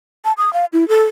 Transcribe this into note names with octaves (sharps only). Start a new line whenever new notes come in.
A5
D#6
F5
E4
A4